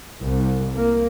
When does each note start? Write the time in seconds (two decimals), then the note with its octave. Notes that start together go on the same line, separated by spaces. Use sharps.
0.19 C2
0.75 A#3